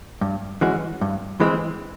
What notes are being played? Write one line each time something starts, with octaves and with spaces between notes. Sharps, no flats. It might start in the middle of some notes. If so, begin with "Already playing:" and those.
G2
E3 G#3 C#4 F#4
G2
E3 G#3 C4